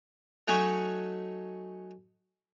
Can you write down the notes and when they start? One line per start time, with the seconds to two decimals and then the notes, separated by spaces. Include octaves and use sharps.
0.48 F#3 A3 C#4 D#4 F#4